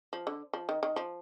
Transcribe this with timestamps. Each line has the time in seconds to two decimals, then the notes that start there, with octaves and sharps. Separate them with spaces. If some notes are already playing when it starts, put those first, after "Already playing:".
0.13 F3
0.27 D3
0.53 F3
0.69 D#3
0.83 D#3
0.96 F3